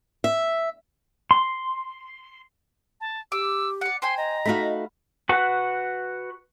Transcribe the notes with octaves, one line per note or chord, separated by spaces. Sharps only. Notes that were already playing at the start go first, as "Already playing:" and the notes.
E5
C6
A5
G4 D6 E6
D5 F#5 C#7
C5 G5 G#5 C6
D#5 A#5
A3 D#4 F#4 F5 B5
F#4 B4 F#5